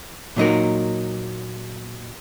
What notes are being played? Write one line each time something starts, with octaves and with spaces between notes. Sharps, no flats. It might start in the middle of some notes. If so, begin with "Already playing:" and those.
A#2 F#3 D#4 A#4